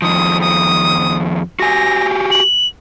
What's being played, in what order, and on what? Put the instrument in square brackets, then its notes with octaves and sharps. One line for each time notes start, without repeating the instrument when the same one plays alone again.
[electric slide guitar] F2 D#3 F3 [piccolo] D#6
[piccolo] D#6
[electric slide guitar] F#4 G4 G#5 [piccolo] A#6
[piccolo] F#7